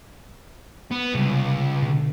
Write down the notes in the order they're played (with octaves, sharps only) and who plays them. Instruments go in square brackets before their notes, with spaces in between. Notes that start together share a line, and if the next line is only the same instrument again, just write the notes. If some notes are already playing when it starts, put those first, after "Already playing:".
[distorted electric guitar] B3
[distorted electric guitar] C#2 [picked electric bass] C3 G3
[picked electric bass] B2 D3